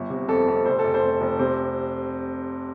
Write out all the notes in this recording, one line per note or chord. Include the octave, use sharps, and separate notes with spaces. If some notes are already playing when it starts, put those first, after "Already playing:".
Already playing: G1
C3
F2 A4
F2
F1 C5
A4
F1
C5
F1
F1
C3 C5